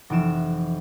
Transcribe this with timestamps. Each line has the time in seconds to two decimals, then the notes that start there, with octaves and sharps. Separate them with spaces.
0.10 F1 E3 D7 E7